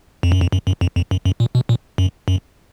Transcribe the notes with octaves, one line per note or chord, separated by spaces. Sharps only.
F2
F#2
F2
F#2
F#2
F2
F2
F#2
F#2
A#2
B2
A#2
F#2
F#2